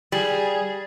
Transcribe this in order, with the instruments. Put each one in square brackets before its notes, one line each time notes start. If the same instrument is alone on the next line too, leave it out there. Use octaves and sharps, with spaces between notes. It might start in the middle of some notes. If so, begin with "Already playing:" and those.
[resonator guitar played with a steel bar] G3 [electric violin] G#4